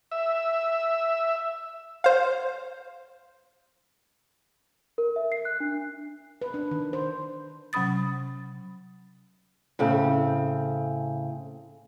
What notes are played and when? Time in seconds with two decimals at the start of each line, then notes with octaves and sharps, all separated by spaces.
0.11 E5
2.04 C5 F5
4.98 A#4
5.16 E5
5.32 C7
5.45 F#6
5.60 D4
6.42 B4
6.54 D4
6.71 D#3
6.93 C5
7.73 C3 F#3 C#4 B5 D#6 A6
9.79 A2 C#3 C4